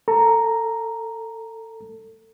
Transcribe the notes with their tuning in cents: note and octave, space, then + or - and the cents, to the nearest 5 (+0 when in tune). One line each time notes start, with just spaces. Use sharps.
A4 +25 A#5 +0